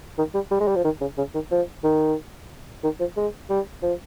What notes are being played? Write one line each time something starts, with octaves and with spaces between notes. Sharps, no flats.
D#3
G3
G3
G#3
G3
F3
D#3
C#3
C#3
D#3
F3
D#3
D#3
F3
G#3
G3
F3